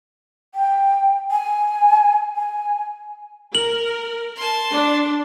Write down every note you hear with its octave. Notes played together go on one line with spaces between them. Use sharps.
G5
G#5
G#5
A#4 F#7
A5 C6
D4